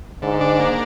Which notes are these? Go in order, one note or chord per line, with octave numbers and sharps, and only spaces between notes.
G#2 D3
D4
A#3